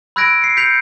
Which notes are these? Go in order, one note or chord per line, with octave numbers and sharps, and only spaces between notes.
B5 E6 F#6 G#6 A#6 D7
C7 C#7
G6 B6 C#7 F7